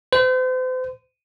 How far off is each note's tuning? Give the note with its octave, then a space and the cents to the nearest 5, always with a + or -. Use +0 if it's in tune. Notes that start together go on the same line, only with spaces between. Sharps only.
C5 -40